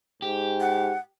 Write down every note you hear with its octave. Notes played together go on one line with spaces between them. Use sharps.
G#2 G4
F#5